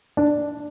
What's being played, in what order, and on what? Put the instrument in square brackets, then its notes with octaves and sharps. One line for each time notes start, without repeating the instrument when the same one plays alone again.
[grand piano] D4